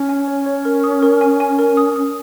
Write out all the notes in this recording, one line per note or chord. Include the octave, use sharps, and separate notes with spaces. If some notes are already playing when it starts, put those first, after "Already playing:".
Already playing: C#4
G#5
C#5
C#5
A#4
D#6
A#4
G#5
G#5
A#4
D#6
D#6